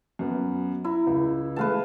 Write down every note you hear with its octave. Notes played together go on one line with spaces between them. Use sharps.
F#2 B3
E4 A#5
C#2
E3 G#3 A3 B4 F5 A5